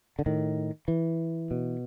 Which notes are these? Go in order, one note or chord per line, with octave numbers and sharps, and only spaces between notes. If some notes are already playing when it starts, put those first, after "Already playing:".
D3
A2 D#3
E3
B2